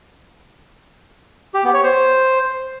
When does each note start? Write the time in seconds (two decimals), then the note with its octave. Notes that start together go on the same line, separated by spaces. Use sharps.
1.54 G4
1.64 B3
1.74 C#5
1.84 C5